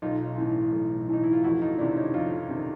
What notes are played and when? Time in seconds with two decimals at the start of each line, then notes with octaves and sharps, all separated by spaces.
0.02 B1 D#4 F4
0.38 A2 E3
0.73 B1
1.08 A2 E3 D#4
1.23 E4
1.33 F4
1.43 F2 E4 F#4
1.62 D#4 F4
1.78 C3 D#3 D4 E4
1.96 C#4 D#4
2.14 F2 D#4 F4
2.49 C3 D#3